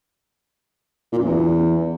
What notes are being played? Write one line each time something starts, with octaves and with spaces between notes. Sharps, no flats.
A#2
F#2
E2